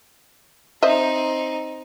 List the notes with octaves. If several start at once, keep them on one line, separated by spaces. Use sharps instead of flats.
C4 D#4 C5 D#5 E5